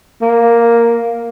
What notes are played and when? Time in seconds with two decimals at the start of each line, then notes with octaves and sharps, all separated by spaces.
0.22 A#3